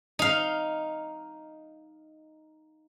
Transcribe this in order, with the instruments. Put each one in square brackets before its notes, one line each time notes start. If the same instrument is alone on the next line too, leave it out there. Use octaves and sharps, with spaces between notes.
[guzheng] D#4 F5